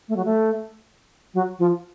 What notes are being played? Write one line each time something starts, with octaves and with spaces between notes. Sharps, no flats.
A3
F#3
A3
F#3
F3